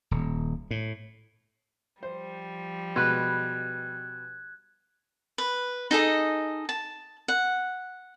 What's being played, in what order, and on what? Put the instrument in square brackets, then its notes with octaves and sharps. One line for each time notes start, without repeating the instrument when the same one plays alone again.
[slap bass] D#1
A2
[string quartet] F3 G3 [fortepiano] C5
[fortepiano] B2 G#3 [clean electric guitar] B4 [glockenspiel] F#6 G#6
[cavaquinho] B4
D#4 G#4 A4 D#5
A5
F#5